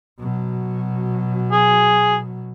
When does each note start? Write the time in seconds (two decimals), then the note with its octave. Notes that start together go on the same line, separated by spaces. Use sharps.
0.20 B2 F#3
1.52 G#4